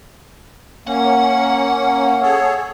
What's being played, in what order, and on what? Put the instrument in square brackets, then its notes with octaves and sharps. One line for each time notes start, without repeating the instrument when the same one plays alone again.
[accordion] A#3 C#4 [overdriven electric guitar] F#5
[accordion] G#4 A4 C#5